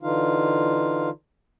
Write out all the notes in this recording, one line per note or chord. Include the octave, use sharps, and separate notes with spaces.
D3 E3 D#4 F4 F5